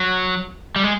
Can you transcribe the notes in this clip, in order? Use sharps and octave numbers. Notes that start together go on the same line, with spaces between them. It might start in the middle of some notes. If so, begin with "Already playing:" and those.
Already playing: F#3
G3
G#3